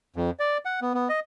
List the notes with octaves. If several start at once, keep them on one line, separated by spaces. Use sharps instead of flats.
F2
D5
F#5
B3
B3
D#5